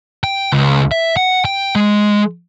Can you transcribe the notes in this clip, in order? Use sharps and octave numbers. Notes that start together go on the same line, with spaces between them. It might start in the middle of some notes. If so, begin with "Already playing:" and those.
G5
C#2
E5
F#5
G5
G#3